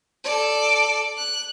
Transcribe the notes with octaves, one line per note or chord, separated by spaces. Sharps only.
A4 D5
F#6